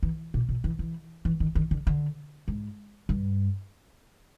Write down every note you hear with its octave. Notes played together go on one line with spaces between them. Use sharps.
E3
A#2
A#2
E3
E3
E3
D#3
D#3
D3
D3
G#2
G2